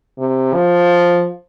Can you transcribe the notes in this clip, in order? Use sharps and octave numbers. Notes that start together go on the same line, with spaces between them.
C3
F3